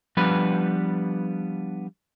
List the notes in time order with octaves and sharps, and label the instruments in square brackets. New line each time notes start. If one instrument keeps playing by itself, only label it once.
[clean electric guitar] F3 G3 B3 D4 B4